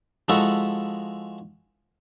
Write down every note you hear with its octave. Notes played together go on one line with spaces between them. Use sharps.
F3 G#3 E4 F#4 A4